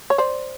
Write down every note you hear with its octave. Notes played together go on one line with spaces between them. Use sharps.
C#5
C5 D5